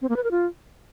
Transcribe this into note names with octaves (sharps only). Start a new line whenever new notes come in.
C4
A#3
B4
A#4
F4